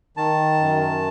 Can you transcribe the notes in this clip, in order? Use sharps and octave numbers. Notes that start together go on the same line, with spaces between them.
D#3 A5
F#2